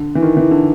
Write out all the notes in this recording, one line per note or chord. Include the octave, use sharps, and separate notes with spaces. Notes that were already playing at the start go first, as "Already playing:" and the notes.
Already playing: D3
E3
D#3
E3
D3